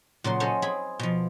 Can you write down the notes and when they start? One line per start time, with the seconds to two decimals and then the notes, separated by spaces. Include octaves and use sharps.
0.24 A#2 C#3 F#3 C6
0.40 C#4 A4 C5 D#5
0.62 C4 G#4 B5
0.99 B2 F3